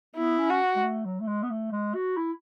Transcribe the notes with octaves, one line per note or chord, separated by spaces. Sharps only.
B3 E4
C#4
F#4
G#3
A3
F#3
A3
G#3
B3
A3
G#3
F#4
E4